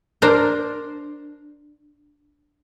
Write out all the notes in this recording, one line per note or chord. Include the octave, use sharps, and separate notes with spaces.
D4 A#4 C5